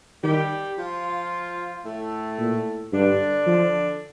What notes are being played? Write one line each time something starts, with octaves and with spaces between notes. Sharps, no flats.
D#3 G3 G4
F3 F4
A2 A3
A#2
G2 D3 D4
F3